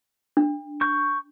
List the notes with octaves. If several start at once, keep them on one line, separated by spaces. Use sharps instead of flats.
D4
C#6 G6